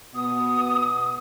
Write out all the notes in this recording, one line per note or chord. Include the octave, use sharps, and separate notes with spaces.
B2 B3 D#6